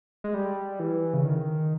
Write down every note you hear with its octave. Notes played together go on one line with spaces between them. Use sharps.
G#3
G3
E3
C#3
D#3